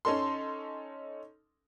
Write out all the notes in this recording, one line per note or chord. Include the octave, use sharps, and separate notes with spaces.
C#4 D#4 A4 C6